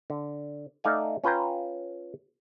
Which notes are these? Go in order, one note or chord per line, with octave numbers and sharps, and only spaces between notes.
D3
A3 D#4 D5 F5 G#5
C#4 F4 B4 G5 A#5